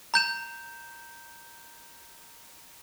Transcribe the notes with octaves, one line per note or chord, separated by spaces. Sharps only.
A#5 G6 E7